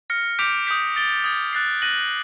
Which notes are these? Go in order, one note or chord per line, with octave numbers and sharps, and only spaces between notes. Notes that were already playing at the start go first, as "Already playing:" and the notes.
F6 A#6 C#7
D6 G6 B6 D7 F7
D#6 G6 B6
A6 D7 G7
D#6 G#6 B6
F#6 A6 C7
F#6 A#6 D#7 F#7